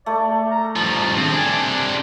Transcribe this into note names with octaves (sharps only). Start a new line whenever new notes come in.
A3 D5
A#5
G2 F3 A5
D#3 C4
C3 D4 G#5